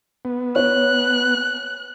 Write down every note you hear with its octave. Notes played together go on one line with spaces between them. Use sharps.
B3
C#5 F#6